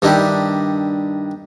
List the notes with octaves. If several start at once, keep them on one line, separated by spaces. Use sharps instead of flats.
G2 D#3 D4 E4 G4